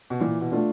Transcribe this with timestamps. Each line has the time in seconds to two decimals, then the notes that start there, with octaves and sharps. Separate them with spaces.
0.10 B2
0.20 A#2 E3
0.41 B2
0.52 A3 D4 F4